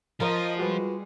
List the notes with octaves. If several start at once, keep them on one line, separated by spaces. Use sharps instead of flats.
F3 F4 A#4 C5 D#5
G3 G#3 F#4 B4